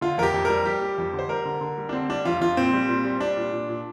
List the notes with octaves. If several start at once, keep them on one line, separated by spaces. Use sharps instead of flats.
D3 F4
F2 G4 A#4
F2
G3 A#4
G3 G4
G3
F2
D3
C5
G3 A#4
D3
D3
G3
D4
D3 C4
G3 D4
F2 F4
F2 F4
A#2 C4
G3
A#2
G3
G3 D4
A#2
A#2
A#2